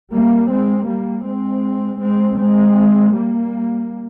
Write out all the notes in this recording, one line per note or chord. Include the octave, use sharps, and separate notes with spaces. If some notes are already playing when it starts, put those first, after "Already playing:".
G3 A#3
G#3 C4
G3 A#3
G#3 C4
G#3 C4
G#3 C4
G3 A#3